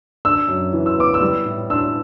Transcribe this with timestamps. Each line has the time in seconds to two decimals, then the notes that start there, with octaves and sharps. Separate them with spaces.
0.25 D4 E6
0.48 F#2
0.73 E3
0.86 E6
0.97 B3 D6
1.14 E6
1.21 G3
1.46 A2
1.70 D4 E6